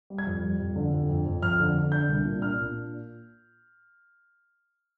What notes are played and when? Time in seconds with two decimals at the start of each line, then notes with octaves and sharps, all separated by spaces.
0.10 G3
0.18 G#6
0.27 F2
0.43 G3
0.59 F2
0.76 D3
0.93 F2
1.09 F2
1.26 F2
1.42 F2 F6
1.60 D3
1.75 D3
1.92 D4 G6
2.09 C2
2.25 A#2
2.42 D4 F6
2.59 A#2